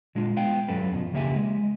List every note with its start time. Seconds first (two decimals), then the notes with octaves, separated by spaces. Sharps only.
0.15 A#2 G#3 D4 F4
0.36 G#3 B3 F5 G5
0.68 B1 G2 F#3 C#4 A4 B4
0.91 E2 B2 D3 F3
1.13 C#2 C#3 A#3 G4 E5 G#5
1.36 G#3